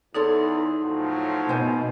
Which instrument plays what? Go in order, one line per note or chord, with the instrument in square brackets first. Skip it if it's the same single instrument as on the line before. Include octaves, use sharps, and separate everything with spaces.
[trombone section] E2 [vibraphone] D#4 C6 [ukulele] A4 C#5 D5
[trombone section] A2 F3 F#3
[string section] B2 [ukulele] C5 G#5